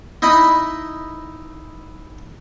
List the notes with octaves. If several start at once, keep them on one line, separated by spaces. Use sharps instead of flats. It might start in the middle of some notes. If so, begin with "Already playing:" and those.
D#4 E4 D#5 B5